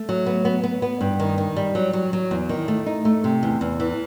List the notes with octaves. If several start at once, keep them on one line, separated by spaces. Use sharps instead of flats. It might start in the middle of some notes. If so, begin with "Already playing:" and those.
Already playing: A3
F#3
B3
B3
B3
B3
G2
D#3
D#3
G3
F#3
F#3
F#3
E2
D#3
A3
D#4
A3
C3
E2
E2
E3